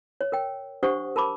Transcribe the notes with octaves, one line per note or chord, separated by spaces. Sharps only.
C#5
A#4 G5
D4 G4 C5 F#5 C#6 D#6
A#4 A5 B5 D6